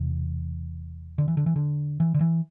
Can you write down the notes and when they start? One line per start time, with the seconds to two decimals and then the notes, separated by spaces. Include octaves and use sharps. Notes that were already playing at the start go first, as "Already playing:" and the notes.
Already playing: E1 E2 C3 E3
1.18 D3
1.28 E3
1.37 D3
1.46 E3
1.56 D3
2.00 E3
2.14 D3
2.21 E3